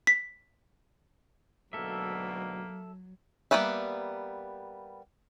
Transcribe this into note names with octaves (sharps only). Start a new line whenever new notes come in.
B6
D2 G#2 B2 F#3 A#3 A4 E5
G3 A#3 B3 B4 E5